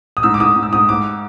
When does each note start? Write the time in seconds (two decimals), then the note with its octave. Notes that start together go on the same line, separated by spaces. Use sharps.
0.17 D#6
0.23 G#2 E6
0.34 D6
0.40 G#2 D#6
0.56 G#2
0.63 E6
0.73 G#2 D#6
0.89 G#2 D6